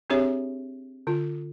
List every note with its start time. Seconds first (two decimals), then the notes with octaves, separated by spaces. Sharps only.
0.10 C4 D4 G4 G#4 C#5 E5
1.07 D3 F4